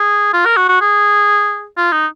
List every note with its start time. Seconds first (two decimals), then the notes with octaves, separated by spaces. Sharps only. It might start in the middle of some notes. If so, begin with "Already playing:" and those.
Already playing: G#4
0.33 F4
0.45 A#4
0.57 F#4
0.69 F#4
0.81 G#4
1.77 F4
1.92 D#4